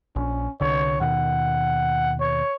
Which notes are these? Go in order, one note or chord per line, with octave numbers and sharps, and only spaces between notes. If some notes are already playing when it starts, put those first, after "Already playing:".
A#1 C#4
C2 D3 C#5
D#2 B2 D#3 F#5
C#5